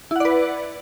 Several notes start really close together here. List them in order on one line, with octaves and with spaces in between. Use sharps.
E4 F#5 D5 B4